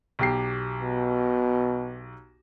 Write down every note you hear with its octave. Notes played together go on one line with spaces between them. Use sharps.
B1 G4 C7
B2